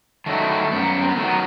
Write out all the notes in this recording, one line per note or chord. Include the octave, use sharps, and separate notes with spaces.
D#3 F#3 A3
F#2 B3
C4
B3
D#3 F#3 A3 B3